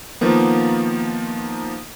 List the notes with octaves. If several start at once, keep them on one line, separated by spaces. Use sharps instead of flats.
D#3 F3 A#3 B3